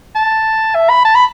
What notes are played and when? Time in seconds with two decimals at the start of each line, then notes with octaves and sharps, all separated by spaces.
0.16 A5
0.75 E5
0.89 B5
1.05 A5
1.15 B5